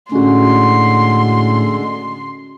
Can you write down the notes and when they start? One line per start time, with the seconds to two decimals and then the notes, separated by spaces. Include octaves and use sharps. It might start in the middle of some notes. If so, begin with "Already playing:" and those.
0.12 A2 D3 G#3 C#4 F#4 C6